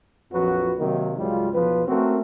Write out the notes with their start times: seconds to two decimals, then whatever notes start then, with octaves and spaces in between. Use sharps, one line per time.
0.33 A#1 F2 F3 F#3 F#4 B4
0.80 C3 D#3 F#3 A#3
1.18 C#2 G#2 F#3 G3 F4
1.54 B1 E2 F3 B4
1.88 A3 A#3 C4 C#4 F#4 A#4